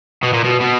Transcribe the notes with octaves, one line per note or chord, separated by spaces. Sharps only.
B2
A#2
B2
B2